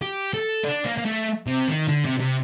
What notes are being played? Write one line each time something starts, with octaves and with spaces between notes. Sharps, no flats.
G4
A4
D4
A#3
A#3
A3
C3
D#3
D3
C3
C3